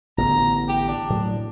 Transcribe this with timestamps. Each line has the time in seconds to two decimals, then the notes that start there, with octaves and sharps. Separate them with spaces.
0.18 A1 D3 B3 A#5
0.68 G4
0.88 D4
1.10 A2 F#3